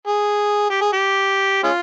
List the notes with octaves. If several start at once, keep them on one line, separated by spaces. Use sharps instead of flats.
G#4
G4
G#4
G4
G#3 C#4 F4